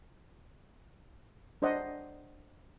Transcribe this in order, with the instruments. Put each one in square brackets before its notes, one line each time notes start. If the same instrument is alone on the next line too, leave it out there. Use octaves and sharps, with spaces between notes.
[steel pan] D4 C5 D5 D#5 F#5